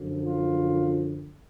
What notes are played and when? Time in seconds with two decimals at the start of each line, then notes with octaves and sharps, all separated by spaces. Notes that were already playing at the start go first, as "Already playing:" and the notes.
Already playing: F#2 D3 F3
0.24 F4